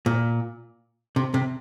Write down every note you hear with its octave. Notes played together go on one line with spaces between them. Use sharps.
A#2
C3
C3